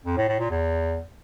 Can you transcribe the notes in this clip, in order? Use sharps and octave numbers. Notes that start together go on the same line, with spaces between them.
F2
A2
A2
A#2
E2